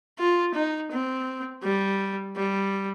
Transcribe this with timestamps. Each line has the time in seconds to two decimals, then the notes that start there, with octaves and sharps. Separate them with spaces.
0.19 F4
0.55 D#4
0.91 C4
1.64 G3
2.36 G3